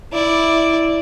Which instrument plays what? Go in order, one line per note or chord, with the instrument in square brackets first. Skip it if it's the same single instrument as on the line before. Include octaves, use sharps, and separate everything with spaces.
[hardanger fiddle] E4 D5